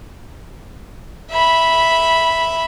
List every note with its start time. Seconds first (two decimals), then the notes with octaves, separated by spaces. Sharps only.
1.31 E5 B5